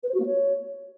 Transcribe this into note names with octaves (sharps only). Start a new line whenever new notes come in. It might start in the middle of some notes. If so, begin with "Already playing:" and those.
B4
C5
F#4
A#3
C#5